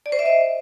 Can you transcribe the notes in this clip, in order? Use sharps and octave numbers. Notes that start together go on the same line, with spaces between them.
D5
C5
E5
D#5